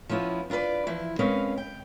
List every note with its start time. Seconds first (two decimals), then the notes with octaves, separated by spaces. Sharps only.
0.09 F3 B3 C#4 E4 F4
0.50 D4 F4 A#4 B4 D5
0.87 E3 F3 E4
1.19 G#3 C4 C#4 A#4 B4 F5
1.58 G5